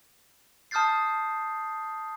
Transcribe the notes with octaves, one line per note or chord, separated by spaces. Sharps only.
A5 D#6 F6 G6 A6 C7